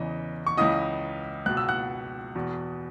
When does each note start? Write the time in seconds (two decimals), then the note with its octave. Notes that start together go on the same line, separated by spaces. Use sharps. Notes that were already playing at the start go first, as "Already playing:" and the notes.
Already playing: E2 C#3 E3 D#5
0.47 C#6
0.57 C#2 C#3 E3 D#5 D#6
1.46 C#2 B2 F#6
1.57 E6
1.69 F#5 F#6
2.35 E2 B2